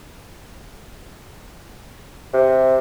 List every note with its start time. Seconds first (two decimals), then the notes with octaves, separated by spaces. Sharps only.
2.34 C3